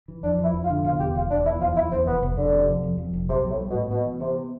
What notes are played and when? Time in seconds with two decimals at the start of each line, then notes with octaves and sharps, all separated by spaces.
0.08 E3
0.23 F2 D4
0.38 F3
0.44 E4
0.54 F2
0.64 F4
0.70 D3
0.84 B2 F4
1.00 E2 G4
1.15 E1 F4
1.30 E1 D4
1.45 E2 E4
1.61 E2 F4
1.76 E2 E4
1.92 E2 C4
2.07 F1 B3
2.23 F1
2.37 F1 D3
2.52 C3
2.68 F2
2.83 F2
2.98 F2
3.13 F1
3.29 B1 C3
3.45 B1
3.50 A2
3.59 G3
3.70 B2
3.75 A2
3.90 B2 B3
4.06 E3
4.20 C3 B3